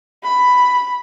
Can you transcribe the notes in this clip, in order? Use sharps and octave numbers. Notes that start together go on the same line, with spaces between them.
B5